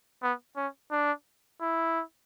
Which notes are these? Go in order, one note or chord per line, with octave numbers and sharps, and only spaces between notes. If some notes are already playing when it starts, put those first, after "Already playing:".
B3
C#4
D4
E4